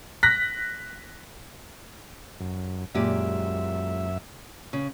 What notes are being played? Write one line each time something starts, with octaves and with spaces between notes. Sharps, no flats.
F#6 A#6 B6
F#2
F#2 A#2 G#3 G4 E5
C#3